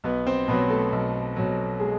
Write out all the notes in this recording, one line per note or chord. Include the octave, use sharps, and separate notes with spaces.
B1 B3 B4
C4 C5
B2 F#3 B3 B4
A3 A4
B1
B2 F#3
G#3 G#4